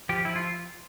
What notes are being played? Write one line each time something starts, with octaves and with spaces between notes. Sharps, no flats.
F3 G4
F3 E4
F4